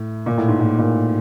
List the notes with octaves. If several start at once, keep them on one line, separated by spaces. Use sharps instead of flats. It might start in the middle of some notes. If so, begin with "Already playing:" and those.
Already playing: A2
A#2
A2
G#2
A2
A#2